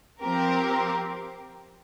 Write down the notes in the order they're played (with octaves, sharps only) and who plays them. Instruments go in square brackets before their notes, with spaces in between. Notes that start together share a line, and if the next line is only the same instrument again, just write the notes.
[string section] F3 C4 G4 A#4